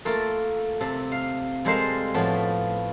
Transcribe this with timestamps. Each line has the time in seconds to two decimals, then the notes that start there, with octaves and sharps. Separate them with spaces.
0.05 A3 A#3 F4 A4
0.81 C3 A4
1.12 F5
1.65 G3 G#3 A4 A#4 C5 F5
2.14 A2 F3 A3 B3